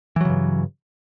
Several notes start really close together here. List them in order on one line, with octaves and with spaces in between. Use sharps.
E3 F#3 C#3 G2